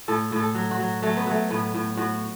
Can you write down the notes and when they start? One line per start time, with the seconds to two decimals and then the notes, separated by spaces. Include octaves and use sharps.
0.08 A2 A4
0.32 A2
0.39 A4
0.55 F#3
0.71 F#4
0.79 F#3
1.02 F#3 A3
1.17 B3
1.27 F#3 A3
1.50 A2 B3
1.75 A2
1.97 A2 F#4